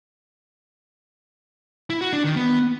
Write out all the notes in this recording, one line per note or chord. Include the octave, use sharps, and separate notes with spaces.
E4
F#4
D4
D#3
B3